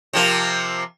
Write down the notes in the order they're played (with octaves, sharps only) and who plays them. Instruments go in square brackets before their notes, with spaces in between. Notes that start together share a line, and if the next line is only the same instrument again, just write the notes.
[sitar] C3 F3 A#3